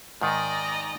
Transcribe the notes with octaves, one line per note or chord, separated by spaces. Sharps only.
G#2 D#3 D5 D#5 A#5